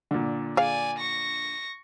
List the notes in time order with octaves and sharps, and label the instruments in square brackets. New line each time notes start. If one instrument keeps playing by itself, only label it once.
[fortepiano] A#2 D3
[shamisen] G#4 F5 [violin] D5 G#5
[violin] C#6 A#6